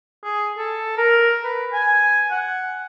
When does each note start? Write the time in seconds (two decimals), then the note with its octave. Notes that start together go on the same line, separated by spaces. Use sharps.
0.24 G#4
0.58 A4
0.97 A#4
1.44 B4
1.73 G#5
2.31 F#5